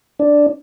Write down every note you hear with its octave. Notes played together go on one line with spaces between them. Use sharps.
D4